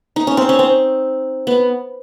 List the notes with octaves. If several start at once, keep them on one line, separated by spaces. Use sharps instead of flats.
D#4
C#4
C4
C#4
C4
B3